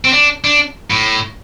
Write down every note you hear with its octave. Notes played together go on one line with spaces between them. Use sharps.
C4
D4
D4
A2